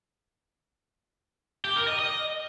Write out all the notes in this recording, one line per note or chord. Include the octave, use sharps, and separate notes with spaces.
G4
A#4
D#5
D#5